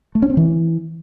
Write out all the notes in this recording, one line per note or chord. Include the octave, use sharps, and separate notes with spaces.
A3
C#4
C4
E3